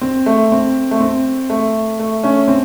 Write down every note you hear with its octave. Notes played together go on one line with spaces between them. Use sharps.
C4
A3
C4
A3
C4
A3
A3
A3 C#4
C4